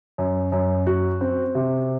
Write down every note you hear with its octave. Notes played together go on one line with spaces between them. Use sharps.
F#2
F#2
F#4
C4
C3